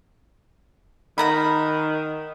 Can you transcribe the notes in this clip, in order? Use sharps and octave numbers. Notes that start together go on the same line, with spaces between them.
D#3 F#5 A#5 B5